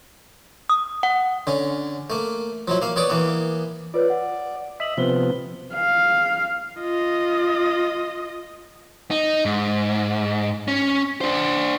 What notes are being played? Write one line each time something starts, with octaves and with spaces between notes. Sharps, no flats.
D#6
F#5
D3 C#4
A3 A#3
F3 F#3 E4
A#3 F5
B3 C#5 D5 D6 D#6
E3 A#3 B3
F4 B4 C#5 D5
F#5
D#5 E5 B6 F#7
C3 F3 B3 B4 C5 G7
F5
F4 D#5
D#4
G#2
C#4
D4 C5